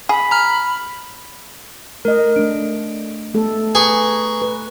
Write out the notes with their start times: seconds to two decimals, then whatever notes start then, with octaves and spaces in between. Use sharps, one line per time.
0.09 G#4 B5
0.31 A#5 F6
2.05 A3 A#4 D#5
2.36 A3 D4 D7
3.34 A3 B3 A4
3.75 G#4 B4 A#5 C#6
4.42 B4